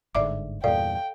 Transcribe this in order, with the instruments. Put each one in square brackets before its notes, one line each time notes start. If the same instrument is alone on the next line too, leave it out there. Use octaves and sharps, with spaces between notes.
[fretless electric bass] G1 G#2 D3 [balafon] D5 E5 D6
[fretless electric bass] E2 G2 A#2 [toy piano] A4 F5 [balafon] D5 [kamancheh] G5